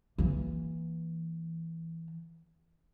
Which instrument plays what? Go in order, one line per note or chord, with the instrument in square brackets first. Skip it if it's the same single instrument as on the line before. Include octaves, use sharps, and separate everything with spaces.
[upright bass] E3 A#3